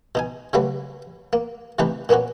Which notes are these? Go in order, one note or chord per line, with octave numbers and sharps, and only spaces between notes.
B2 D#4 G#5
C#3 F#3 G3 A3 F#4 B4
A#3
C3 E3 A3 D#4 G4 B4
A#2 A#3 B3 C#4 F#4